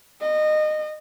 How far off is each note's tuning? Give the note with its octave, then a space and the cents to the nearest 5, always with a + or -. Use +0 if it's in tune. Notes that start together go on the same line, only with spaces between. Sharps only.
D#5 -25